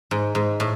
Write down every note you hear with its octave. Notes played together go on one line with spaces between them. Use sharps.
G#2
G#2
A2